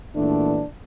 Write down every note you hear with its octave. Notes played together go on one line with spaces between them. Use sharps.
A#2 E3 F#3 A3 B3 D4